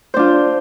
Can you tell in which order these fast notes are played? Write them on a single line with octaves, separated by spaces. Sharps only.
C5 D4 F4